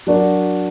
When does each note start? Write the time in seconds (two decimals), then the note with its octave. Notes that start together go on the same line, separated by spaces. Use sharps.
0.07 F#3 D4 F#4 A#4